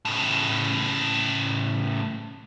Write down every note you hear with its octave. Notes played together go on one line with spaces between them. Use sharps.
A2 C#3